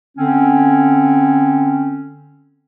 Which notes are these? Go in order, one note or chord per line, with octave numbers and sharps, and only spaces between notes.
D3 C4 C#4